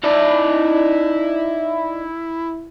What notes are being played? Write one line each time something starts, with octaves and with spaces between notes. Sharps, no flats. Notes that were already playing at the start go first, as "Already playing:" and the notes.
D#4 E4 D5